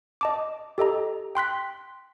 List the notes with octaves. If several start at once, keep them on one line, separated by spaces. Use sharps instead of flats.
D#5 A5 D6
G4 A4 D#5 A#5
G5 C6 F#6 B6